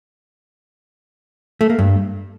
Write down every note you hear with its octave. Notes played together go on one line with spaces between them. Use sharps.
A3
A#3
G2